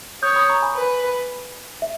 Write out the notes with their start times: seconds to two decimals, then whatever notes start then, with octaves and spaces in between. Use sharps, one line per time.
0.23 C#5 D#6 G6
0.36 B5 D#6
0.49 A#5 C#6
0.62 G#5 B5
0.76 B4
1.82 E5